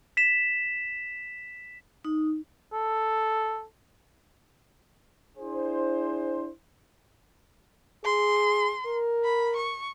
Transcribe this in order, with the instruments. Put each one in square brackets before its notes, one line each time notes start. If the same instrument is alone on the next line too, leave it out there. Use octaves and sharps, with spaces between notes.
[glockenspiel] B6 E7
[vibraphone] D#4
[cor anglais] A4
[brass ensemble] D4 E4 G#4 C5
[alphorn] G#4 [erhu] C6
[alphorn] A#4
[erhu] B5
C#6